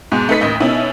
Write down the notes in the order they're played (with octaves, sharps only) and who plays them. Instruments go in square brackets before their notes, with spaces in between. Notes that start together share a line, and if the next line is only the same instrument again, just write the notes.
[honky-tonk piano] G#2 B2 G#3
A3 D#4 B4 B6
A1 D#2 D#5
B2 C#4 D#4 E4